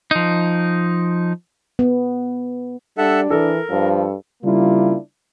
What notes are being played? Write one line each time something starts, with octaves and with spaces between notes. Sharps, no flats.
F3 D#4
B3
G3 D4 A4 E5 F#5
E3 A4 A#4
G2 F3
C#3 G3 A#3 D4 E4 F4